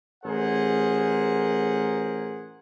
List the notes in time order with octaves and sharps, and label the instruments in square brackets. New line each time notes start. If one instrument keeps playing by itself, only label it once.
[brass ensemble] A1 G#4 A#4 C5 F#5